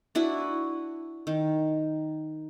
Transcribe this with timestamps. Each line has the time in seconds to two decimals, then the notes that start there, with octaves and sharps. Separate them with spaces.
0.15 D4 E4 F#4 B4
1.27 D#3